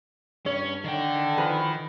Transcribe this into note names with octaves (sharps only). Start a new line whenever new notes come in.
G2 C#4 C#5
D3 D#3 G5
E3 F3 B4